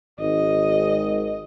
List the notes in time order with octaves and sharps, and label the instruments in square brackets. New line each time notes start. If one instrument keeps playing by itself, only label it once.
[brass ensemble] G#1 [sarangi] D#5